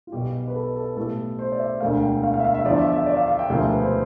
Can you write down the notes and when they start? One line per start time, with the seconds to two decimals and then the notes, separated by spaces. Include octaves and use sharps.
0.07 F4
0.12 B1 B2 G3 G4
0.48 B4
0.55 A4
0.76 A4
0.96 B1 A2 G3 A4
1.39 C5
1.52 D5
1.59 E5
1.80 E1 D2 D3 F5
2.02 G5
2.23 F5
2.34 F5
2.40 E5
2.44 F5
2.55 E5
2.65 E2 D3 F3 D5
2.79 E5
2.92 E5
3.06 D5
3.17 F5
3.27 F5
3.39 G5
3.48 E1 D2 C3 F3 F5
3.59 E5
3.70 B4
3.80 C5